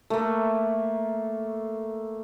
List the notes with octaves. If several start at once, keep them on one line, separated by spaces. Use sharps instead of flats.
A3 A#3